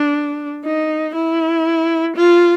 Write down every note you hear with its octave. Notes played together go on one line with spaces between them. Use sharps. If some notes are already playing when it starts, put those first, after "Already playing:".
Already playing: D4
D#4
E4
F4